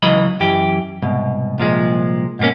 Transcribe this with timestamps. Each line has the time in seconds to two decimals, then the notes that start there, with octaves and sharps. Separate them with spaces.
0.02 C#2 E3 F#3 D#5 B5
0.40 F#2 E3 G4
1.03 C2 G#2 B2
1.58 C2 A#2 F3 G#3
2.39 G#2 B2 G3 A#3 C#4